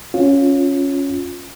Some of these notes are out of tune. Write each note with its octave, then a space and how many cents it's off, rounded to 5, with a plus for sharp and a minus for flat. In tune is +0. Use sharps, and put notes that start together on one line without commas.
C#4 +0 F4 +15